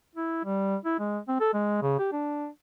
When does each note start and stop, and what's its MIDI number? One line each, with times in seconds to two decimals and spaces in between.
0.16 0.43 64
0.45 0.76 55
0.85 0.95 64
0.99 1.18 56
1.28 1.36 60
1.40 1.50 69
1.54 1.79 56
1.82 1.97 49
1.99 2.11 67
2.12 2.48 62